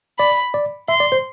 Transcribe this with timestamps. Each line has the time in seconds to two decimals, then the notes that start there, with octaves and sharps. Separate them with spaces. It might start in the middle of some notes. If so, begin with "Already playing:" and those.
0.19 D5 B5
0.54 D5
0.88 E5 C6
1.00 D5
1.12 C5